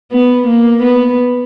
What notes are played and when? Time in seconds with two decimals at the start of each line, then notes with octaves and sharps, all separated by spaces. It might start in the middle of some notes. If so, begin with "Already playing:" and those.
0.12 B3
0.47 A#3
0.82 B3